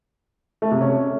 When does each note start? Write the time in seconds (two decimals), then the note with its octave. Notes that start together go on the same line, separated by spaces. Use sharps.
0.62 A3
0.71 C3
0.81 C#4